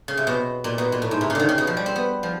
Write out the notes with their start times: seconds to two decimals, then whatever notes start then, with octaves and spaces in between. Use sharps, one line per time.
0.08 C#3
0.17 C3
0.27 B2
0.64 A#2
0.78 B2
0.92 A#2
1.02 A2
1.11 G#2
1.21 C3
1.30 C#3
1.35 D3 D#3
1.49 C#3
1.58 B2
1.67 F3
1.77 G3
1.86 C4
1.96 B3
2.23 F3